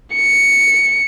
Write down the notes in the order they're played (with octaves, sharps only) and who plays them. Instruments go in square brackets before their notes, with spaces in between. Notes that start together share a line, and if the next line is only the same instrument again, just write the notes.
[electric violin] C#7